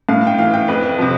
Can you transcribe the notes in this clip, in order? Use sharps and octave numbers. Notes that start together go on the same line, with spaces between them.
A2 F5
G5
E3 F5
G5
F2 B4
C3 F3